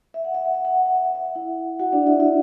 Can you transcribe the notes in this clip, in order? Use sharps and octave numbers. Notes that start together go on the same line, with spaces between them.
E5
F#5
E5
F#5
E5
F#5
E5
F#5
E5
F#5
E5
F#5
E4 E5
F#4 F#5
D4 D5
E4 E5
E4 E5